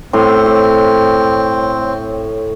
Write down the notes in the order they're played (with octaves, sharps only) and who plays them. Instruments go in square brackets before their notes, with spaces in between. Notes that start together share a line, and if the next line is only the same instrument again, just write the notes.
[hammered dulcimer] A2 C6 [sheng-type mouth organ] C4
[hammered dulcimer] C#5